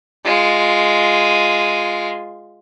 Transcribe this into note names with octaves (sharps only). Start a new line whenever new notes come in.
G#3 F4